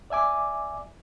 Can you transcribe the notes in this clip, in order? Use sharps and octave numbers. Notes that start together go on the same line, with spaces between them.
D5 E5 G#5 D6